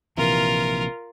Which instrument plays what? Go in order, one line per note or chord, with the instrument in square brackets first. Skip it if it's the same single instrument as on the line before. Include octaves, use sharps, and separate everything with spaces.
[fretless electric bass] A#1 C3 E3 [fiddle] F4 A#4